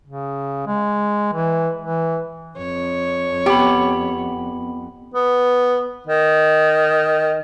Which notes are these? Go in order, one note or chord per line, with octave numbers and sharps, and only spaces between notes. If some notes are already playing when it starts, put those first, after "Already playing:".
C#3
G#3
E3
E3
F2 C#5
B3 G4 B5
B3
D#3